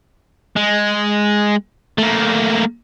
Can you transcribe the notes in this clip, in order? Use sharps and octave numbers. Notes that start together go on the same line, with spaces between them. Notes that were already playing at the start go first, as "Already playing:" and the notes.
G#3
A3 A#3